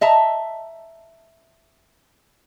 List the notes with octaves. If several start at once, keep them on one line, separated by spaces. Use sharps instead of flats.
D#5 E5 A5 A#5